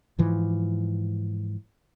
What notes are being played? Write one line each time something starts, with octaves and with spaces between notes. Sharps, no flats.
G#2 E3 F3